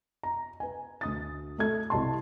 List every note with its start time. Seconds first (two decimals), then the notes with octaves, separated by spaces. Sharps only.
0.23 A#5
0.60 B4 G#5
1.01 D2 D#6 A6
1.58 A3 A4 G#6
1.90 C2 C3 G4 D#5 A5 C6